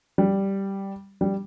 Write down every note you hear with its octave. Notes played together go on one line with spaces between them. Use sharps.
G3
G3